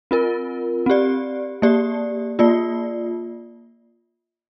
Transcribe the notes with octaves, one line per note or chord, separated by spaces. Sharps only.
C4 F4 A#4
C4 G4 D5
A#3 G4 D5
A#3 F4 D5